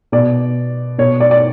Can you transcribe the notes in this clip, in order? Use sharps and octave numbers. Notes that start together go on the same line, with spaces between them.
B2 D5
B2 C#5
D5
D5